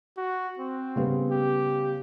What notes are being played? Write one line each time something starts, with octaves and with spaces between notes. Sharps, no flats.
F#4
C4
C#3 G3 B3
G4